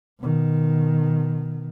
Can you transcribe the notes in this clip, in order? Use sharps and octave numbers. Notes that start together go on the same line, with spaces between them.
B2 D#3